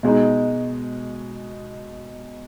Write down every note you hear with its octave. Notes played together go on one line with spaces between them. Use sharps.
B2 G#3 D#4